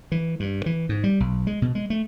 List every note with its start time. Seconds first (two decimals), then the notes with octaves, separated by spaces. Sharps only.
0.12 E3
0.40 G2
0.66 E3
0.89 G#2
1.04 G3
1.20 B1
1.47 G#3
1.62 B2
1.75 G#3
1.90 A3